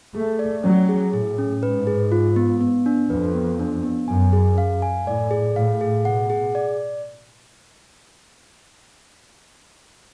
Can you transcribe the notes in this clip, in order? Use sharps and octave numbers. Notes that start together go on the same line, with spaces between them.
A3 G#4
D5
F#3 C#4
G#4
A2 G#4
C#4
G#2 B4
G#4
F4
B3
B3
D4
F2 B4
B3
D4
B3
F#2 G#5
G#4
F5
G#5
A2 D5
G#4
A2 F5
G#4
B2 F#5
G#4
D5